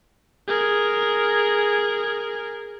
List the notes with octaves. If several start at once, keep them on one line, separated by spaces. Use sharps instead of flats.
G#4 A#4